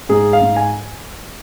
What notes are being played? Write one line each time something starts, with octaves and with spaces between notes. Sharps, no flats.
G#2 G#4
F5
G#2
G#5